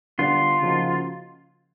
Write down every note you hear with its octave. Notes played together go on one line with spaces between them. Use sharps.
D3 G3 B3 D4 F4
C#3 F3 A#3 D#4 F#4